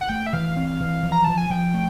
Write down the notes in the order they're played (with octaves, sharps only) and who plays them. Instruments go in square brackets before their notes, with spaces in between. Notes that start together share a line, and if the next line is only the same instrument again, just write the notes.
[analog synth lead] F#5
[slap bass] A3 [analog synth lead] G5
[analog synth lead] E5
[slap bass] E3 [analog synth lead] F5
[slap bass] C4
E3
F3
[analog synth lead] A#5
[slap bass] F3 [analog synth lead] A5
[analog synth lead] G#5
[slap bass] F3 [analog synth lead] G5
[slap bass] A3